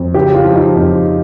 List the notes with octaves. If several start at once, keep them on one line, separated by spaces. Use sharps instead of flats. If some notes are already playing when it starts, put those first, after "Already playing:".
Already playing: F2
C#3 G4
F4
F3
D#4
F2